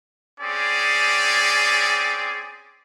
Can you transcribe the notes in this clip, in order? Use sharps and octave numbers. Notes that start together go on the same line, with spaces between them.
C4 C#4 G4 G#4 D5